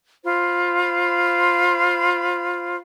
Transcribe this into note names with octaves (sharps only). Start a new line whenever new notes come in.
F4 C5 B5